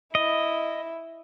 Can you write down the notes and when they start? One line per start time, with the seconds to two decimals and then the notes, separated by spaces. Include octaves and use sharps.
0.15 E4 D#5